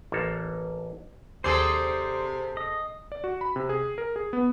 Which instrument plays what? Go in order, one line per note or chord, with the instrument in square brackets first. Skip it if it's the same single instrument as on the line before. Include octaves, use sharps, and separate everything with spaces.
[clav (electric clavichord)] A1 A#3 A4
[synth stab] D#2 C7 [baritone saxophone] C3 [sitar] C4 G#4 A4 [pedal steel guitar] C5 D5
[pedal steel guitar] D#5
[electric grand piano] D5
F#4
B5
C3
G#4
A#4
G#4
B3